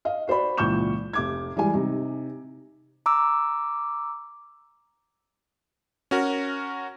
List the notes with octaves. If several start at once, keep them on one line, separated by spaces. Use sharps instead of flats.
D#5 F5
F#4 C5 D5 B5
C#2 A#2 E3 C#6 G6 E7
F1 D6 G#6
E3 G3 G#3 G#5
C3 D#4
A#5 D6 E6
C#4 F#4 A#4